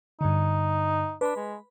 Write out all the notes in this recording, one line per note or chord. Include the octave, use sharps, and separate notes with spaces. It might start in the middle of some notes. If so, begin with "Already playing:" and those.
G2 D3 D#4
D4 B4 B5
G#3